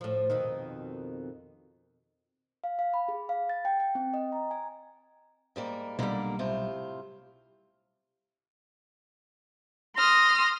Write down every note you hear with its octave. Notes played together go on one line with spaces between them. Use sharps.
A2 F3
F2 B2 D#3
F5
F5
B5
G#4
F5
A6
G5
G5
C4
D#5
A#5
G#5
G#2 G3 A#3
B1 A#2 D3 G3 A#3
A2 C3 F4
C6 D#6 F6 A#6